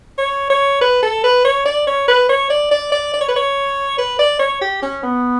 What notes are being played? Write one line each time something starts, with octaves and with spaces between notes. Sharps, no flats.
C#5
C#5
B4
A4
B4
C#5
D5
C#5
B4
C#5
D5
D5
D5
D5
C#5
B4
C#5
B4
D5
C#5
G4
C#4
B3